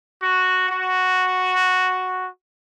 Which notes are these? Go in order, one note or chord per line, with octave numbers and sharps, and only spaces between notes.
F#4
F#4